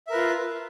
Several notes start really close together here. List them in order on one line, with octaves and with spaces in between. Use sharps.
E5 A#4 B4 F4